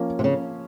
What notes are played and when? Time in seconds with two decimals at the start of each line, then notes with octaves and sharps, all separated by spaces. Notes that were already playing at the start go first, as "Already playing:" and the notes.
Already playing: F3 A#3 C#4
0.19 C3
0.24 C#3